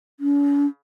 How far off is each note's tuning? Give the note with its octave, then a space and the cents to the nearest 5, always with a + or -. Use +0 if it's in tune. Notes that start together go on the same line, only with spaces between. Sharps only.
C#4 +45